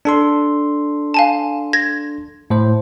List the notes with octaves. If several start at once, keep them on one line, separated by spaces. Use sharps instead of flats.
D4 A4 C6
F5 G#5 A5
G#6 A#6
A2 C5